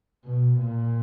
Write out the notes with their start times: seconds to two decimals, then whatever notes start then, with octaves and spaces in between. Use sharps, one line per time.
0.25 B2
0.58 A#2